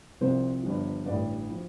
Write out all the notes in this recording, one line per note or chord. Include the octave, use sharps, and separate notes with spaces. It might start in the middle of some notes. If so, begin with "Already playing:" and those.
C2 C3 F3 C5
G1 G2 D3 F3
A1 G2 D3 D5
F3